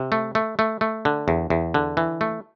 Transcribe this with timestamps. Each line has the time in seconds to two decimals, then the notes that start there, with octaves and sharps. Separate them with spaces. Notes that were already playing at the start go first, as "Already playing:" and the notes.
Already playing: C3
0.12 A3
0.35 A3
0.59 A3
0.81 A3
1.05 D3
1.28 E2
1.50 E2
1.74 D3
1.97 E3
2.21 A3